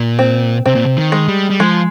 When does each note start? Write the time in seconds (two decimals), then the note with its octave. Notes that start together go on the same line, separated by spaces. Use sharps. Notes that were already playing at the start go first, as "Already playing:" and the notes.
Already playing: A#2
0.19 C4
0.66 C3 C4
0.75 A#2
0.86 C3
0.97 D#3
1.12 G#3
1.28 G3
1.50 G3
1.60 F3 G#3